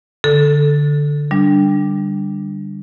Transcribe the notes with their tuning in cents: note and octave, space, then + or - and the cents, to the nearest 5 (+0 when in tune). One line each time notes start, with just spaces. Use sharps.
D3 +0 A4 +0
G3 +0 D4 +0